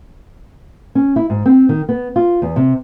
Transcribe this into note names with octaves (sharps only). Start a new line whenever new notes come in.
C#4
E4
G#2
C4
D#3
B3
F4
E2
C3